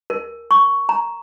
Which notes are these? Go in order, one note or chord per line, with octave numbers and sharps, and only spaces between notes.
A#4
C#6
A#5